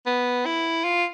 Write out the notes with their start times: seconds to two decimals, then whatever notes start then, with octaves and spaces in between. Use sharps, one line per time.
0.06 B3
0.45 E4
0.84 F4